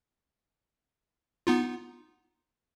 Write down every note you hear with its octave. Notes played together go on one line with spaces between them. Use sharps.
B3 D#4 F4